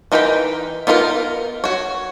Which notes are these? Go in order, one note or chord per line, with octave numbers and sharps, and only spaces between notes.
E3 D#4 A#4 G5 B5
B3 D#4 F4 A4 A#4
F#4 C#5